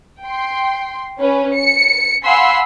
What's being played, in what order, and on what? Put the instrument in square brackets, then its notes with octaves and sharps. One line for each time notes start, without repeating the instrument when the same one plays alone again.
[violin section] G5 C6
C#4 B4
C#7
F5 F#5 G#5 B5 C6 E6